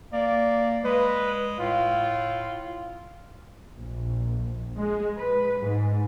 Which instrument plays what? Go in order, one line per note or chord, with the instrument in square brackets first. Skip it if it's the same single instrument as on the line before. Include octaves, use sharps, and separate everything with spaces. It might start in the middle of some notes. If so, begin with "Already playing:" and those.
[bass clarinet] A#3 [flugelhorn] D5
[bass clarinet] G#3 [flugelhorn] B4
[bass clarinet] A2 [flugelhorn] F4
[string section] A#1
G#3
B4
G#2